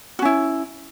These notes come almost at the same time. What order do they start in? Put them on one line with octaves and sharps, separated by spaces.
F#4 C#4 E4